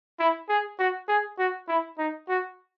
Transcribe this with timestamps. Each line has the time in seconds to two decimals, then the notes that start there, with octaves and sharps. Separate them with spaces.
0.20 E4
0.49 G#4
0.79 F#4
1.08 G#4
1.39 F#4
1.68 E4
1.98 D#4
2.29 F#4